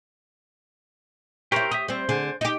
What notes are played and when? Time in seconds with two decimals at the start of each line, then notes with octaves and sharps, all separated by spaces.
1.52 E4 G4 A#4 C5 C#5
1.71 G4 E5 D#6
1.88 G3 C4 C5
2.09 D3 G#4
2.41 D#4 G4